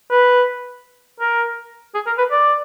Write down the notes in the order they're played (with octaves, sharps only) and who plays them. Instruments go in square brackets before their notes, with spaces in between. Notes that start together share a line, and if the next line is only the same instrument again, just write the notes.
[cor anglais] B4
A#4
G#4
A#4
B4
D5